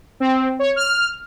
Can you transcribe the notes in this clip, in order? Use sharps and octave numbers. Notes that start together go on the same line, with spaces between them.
C4
C#5
F6